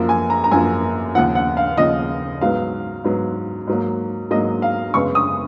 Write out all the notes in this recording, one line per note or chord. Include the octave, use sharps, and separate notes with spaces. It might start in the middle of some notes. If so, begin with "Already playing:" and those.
Already playing: F#2 F3 A#3
G#5
A#5
A#5
F#2 F3 A#3 G#5
D#2 C#3 F3 F#5
F#5
F5
D#2 C#3 F3 D#5
G#2 F#3 B3 F5
G#2 F#3 B3
G#2 F#3 A#3
G#2 F#3 A#3 D#5
F5
F#2 C#3 G#3 B3 C#6
D#6